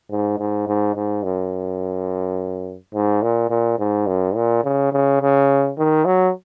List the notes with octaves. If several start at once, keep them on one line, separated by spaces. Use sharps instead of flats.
G#2
G#2
G#2
G#2
F#2
G#2
A#2
A#2
G#2
F#2
A#2
C#3
C#3
C#3
D#3
F#3